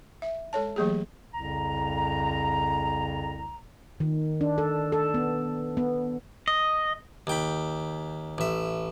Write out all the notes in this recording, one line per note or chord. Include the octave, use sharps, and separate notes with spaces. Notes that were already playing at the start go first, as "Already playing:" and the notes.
E5
G#3 A4 C#5 A5
E3 F#3 A3 A#3 G4 G#4
C2 F2 C#3 A#5
D#3
D4
A4
A4
B3
B3
D#5
D#2 G5 B5
A1 E5